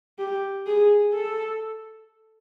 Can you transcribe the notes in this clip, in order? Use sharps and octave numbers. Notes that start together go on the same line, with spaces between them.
G4
G#4
A4